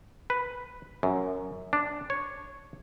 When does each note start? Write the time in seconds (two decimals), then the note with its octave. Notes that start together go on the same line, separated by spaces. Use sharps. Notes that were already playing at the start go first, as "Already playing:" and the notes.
0.30 B4
1.03 F#2
1.73 D4
2.10 C#5